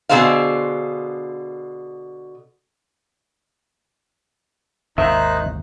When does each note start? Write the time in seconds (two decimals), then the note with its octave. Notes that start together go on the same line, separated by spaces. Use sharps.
0.09 B2 D3 D#4 G#4 C5 F5
4.98 G#1 D#2 D#3 D#4 C5 E5 F5 F#6